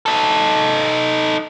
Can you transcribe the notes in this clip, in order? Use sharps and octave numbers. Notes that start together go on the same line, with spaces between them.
D#4 A4